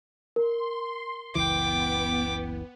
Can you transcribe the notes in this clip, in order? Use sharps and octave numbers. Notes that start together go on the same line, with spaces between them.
A#4 C6
F#1 C#2 E3 B3 G5 D6